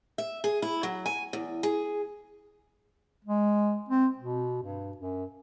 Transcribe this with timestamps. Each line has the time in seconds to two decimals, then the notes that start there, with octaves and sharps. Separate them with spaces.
0.18 E5
0.44 G#4
0.62 E4
0.83 F#3
1.06 G#5
1.33 E2
1.63 G#4
3.25 G#3
3.89 C4
4.18 B2
4.63 G2
4.97 F#2